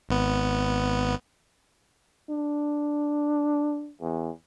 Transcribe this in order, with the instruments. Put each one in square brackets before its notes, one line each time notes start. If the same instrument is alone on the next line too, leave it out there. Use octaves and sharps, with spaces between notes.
[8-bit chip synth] G#1 B3
[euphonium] D4
E2